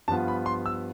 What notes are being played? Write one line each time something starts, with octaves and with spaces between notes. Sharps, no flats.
G2 F3 B3 F4 A5
B5
C6
E6